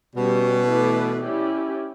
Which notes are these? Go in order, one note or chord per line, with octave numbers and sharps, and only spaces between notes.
B2 G3 C#4 G4
E3 A3 E4 B4 D5
C#4 E4 G4 D5